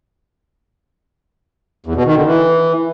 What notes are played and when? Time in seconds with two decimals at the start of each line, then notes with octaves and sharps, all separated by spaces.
1.86 E2
1.96 B2
2.06 D#3
2.16 D3
2.26 E3